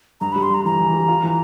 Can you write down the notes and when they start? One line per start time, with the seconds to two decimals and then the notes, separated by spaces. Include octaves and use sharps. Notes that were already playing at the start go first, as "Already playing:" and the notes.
0.21 G2 A#5
0.32 G3 B5
0.43 C6
0.50 G2 A#5
0.65 E3 A#5
0.80 E3
0.94 G3
1.08 F4
1.23 E3